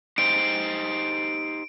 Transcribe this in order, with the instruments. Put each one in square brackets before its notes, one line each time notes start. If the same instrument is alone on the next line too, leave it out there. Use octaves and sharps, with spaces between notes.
[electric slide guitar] D#4 G4 C5 [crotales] D7